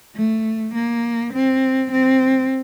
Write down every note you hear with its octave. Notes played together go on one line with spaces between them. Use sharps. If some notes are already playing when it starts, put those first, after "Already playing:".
A3
A#3
C4
C4